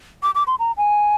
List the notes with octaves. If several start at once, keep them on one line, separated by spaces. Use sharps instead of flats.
D6
D6
C6
A#5
G#5